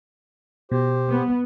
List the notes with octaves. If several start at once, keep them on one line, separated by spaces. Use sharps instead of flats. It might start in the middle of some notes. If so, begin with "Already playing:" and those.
B2 G4 C5
B3